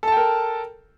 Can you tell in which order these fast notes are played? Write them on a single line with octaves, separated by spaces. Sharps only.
A4 A5 G5 A#4